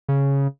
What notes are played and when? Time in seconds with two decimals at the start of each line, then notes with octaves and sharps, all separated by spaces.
0.09 C#3